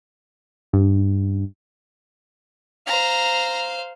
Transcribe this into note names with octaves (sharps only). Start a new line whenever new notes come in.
G2
C5 F5 A#5